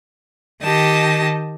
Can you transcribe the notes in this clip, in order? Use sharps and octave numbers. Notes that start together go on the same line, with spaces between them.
D#3 G4 D#5 A5